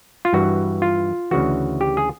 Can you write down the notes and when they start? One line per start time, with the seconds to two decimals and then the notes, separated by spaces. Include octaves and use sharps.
0.25 F4
0.33 G2 E3 F#4
0.82 F4
1.31 D2 C#3 E3 F#4
1.81 G4
1.97 G#4